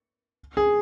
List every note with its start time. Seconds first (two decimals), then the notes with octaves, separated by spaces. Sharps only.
0.57 G#4